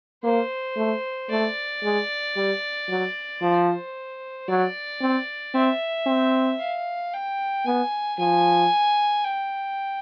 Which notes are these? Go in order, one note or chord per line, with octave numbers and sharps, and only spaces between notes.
A#3 C5
A3
A3 D5
G#3
G3
F#3
F3 C5
F#3 D5
C4
C4 E5
C4
F5
G5
B3 G#5
F3 G#5
G5